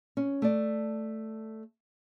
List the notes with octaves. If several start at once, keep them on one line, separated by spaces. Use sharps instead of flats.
C#4
A3 D5